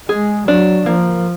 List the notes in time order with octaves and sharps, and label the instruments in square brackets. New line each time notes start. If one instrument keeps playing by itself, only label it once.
[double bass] G#3 [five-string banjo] G#4
[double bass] F#3 [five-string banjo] D4
[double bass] F3 [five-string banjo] A#3